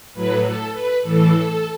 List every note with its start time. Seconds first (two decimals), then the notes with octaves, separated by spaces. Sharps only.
0.14 A2 F#3 B4
0.43 A4
0.72 B4
1.02 A2 E3 A4